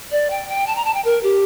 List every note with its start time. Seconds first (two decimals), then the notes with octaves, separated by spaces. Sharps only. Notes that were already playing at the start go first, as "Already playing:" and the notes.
0.11 D5
0.30 G5
0.48 G5
0.67 A5
0.76 A#5
0.85 A5
0.94 G5
1.05 A#4
1.23 G4